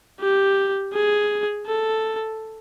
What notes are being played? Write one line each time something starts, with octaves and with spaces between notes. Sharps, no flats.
G4
G#4
A4